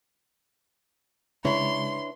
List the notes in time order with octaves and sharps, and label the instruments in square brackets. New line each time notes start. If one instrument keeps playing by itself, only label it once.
[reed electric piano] C#3 G#3 [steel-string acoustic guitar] D4 B4 C#5 [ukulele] E4 B5 [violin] C6